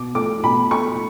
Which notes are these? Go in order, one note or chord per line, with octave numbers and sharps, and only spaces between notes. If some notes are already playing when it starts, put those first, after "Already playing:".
Already playing: B2 D6
A3 D6
B2 B5
A3 C#6